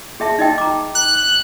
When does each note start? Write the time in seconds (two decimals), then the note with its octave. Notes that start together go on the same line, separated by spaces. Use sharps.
0.20 G#4 E5 A5
0.39 D#4 D#5 G5
0.58 A#5 D6
0.95 F#6